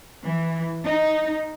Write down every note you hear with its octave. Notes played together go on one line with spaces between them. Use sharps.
E3
D#4